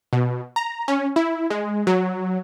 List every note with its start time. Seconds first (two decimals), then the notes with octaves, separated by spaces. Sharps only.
0.13 B2
0.56 A#5
0.88 C#4
1.16 E4
1.50 G#3
1.87 F#3